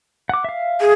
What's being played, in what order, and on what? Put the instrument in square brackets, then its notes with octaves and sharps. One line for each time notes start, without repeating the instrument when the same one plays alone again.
[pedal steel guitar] F#5 D6
E5 F5
[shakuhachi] G#4